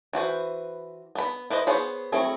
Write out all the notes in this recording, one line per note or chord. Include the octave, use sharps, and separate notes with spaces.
E3 F#4 B4 C5
B3 B5
E4 B4 C5 D#5
B3 G#4 C5 C#5 B5
F#3 A3 C4 E4 G#4